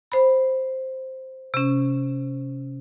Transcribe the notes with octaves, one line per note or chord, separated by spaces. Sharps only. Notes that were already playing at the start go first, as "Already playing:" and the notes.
C5 B5
C3 C#4